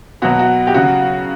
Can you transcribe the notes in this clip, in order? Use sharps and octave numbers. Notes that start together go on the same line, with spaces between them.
B2 F#3 F#4
F#4
G4
C#3 F#3 F#4